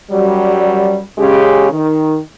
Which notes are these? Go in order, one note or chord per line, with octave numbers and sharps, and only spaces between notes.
F#2 F#3 G3
C#3 G#3 C#4 G4
D#3